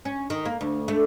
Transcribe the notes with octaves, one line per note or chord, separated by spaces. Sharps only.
C#4
D#3
A#3
D2
A3